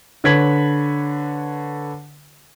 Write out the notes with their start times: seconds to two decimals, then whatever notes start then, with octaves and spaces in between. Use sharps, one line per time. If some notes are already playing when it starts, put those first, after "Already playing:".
0.24 D3 B4 C#5 G#6 B6 F#7